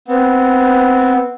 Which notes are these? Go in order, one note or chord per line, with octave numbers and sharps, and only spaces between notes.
B3 C4